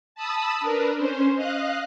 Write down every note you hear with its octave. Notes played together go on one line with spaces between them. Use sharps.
A5 B5 D#6 E6
D4 A#4 B4
C#4 C5
D#5 F5 F#6